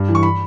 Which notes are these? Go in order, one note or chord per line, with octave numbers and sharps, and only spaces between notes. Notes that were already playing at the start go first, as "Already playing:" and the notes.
Already playing: G2
E3
C#6
B5